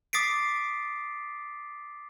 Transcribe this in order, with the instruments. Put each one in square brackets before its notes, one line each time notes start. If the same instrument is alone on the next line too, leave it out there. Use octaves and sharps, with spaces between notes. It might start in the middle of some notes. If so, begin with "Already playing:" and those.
[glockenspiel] D6 D#6 A6 B6 C7 D7